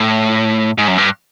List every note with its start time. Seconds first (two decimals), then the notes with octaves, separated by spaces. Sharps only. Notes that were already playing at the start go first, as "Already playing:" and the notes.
Already playing: A2
0.78 G#2
0.88 F#2
0.98 G2